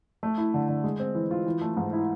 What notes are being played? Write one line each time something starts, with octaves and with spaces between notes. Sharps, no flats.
A3
E4
D3
D3
G#3
C4
E3
F4
E3
A3
G#2
E4